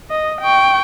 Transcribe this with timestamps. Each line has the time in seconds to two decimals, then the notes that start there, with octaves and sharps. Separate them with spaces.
0.11 D#5
0.41 G5 C#6